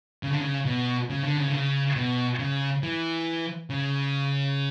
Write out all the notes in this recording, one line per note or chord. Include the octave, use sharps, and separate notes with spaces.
C#3
D3
C#3
B2
C#3
D3
C#3
D3
C#3
B2
C#3
E3
C#3